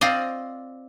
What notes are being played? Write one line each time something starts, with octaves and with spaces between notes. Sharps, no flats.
C4 F4 D5 D#5